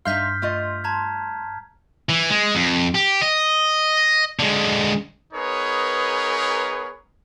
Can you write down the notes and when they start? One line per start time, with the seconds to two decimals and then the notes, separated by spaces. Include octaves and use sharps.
0.05 G2 D#4 E5 F5 C6 F6 G6 B6
0.42 A3 F4 D#5
0.84 A5 A#5 G#6
2.09 E3
2.30 G#3
2.55 F2
2.95 G4
3.21 D#5
4.39 D3 G#3
5.33 B3 D#4 G#4 A#4 B4 C#5